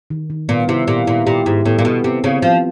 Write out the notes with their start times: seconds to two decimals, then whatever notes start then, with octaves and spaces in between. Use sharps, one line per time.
0.10 D#3
0.30 D#3
0.49 A#2 B3
0.68 C3 E4
0.88 A#2 G4
1.06 A#2 E4
1.26 A#2 G4
1.46 G#2 E4
1.65 A2 B3
1.79 A#2
1.84 B2 B3
2.04 C3 C4
2.24 C#3 C4
2.42 F3 F4